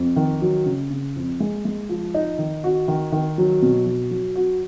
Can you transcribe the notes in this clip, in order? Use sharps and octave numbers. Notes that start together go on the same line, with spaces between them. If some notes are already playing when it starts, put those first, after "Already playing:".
Already playing: F2
D#3
F#3
C#3
C#3
F2
G#3
G#3
F3
D#4
D#3
F#4
D#3
D#3
F#3
B2
F#3
F#3
F#4